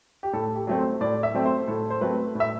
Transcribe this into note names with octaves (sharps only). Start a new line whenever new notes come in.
G4
A2 A4
G4
F#3 A3 C4
C5
A2 D5
E5
F#3 A3 C4
C5
A2 A4
C5
F#3 A3 C4 B4
A2
E5